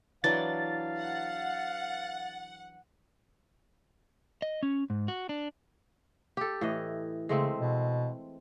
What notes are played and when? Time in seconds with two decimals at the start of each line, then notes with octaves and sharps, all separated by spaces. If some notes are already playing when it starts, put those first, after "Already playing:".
0.24 E3 F#3 D4 F5 A6
0.99 F#5
4.42 D#5
4.63 C#4
4.90 G#2
5.08 F#4
5.29 D4
6.37 G4 A4
6.61 A2 E3 D#5
7.29 C#3 G#3 A3 C4
7.60 B2